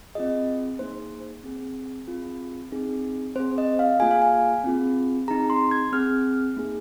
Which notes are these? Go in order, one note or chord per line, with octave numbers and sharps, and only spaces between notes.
C4 F4 G#4 D#5
A#3 D#4 G#4 C5
C4 G#4
C4 F4 G#4
C4 D#4 G#4
C4 G#4 C5
D#5
F5
A#3 F4 G#4 G#5
F5
G#5
C4 F4 G#4
C4 D#4 G#4 A#5
C6
G#6
C4 G#4 F6
A#3 D#4 G#4